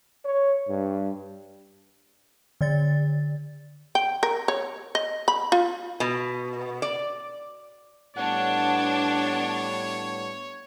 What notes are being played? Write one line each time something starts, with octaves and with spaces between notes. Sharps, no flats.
C#5
G2
D3 D5 A6
G5
A#4
C#5
D#5
B5
F4
B2
D5
A2 G3 B3 D4 C#5 F#5